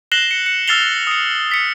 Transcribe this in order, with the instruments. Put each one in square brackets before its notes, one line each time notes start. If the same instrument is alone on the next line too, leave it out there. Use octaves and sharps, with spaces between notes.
[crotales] F#6 A#6 C7 E7 F#7 G7
C#7
C#7
E6 F6 A6 C7 F7 G7
D#6 C#7
B6 C#7